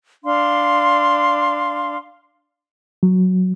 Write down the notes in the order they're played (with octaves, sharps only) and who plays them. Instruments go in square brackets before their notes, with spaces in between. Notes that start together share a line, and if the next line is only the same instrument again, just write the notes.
[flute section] D4 F5 C6
[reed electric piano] F#3